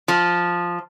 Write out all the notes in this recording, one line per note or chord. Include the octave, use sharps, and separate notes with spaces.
F3